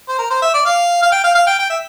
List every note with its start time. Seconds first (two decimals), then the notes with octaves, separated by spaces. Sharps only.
0.08 C5
0.19 A#4
0.30 C5
0.42 E5
0.54 D5
0.65 F5
1.02 F5
1.12 G5
1.24 F5
1.35 F5
1.47 G5
1.59 G5
1.70 E5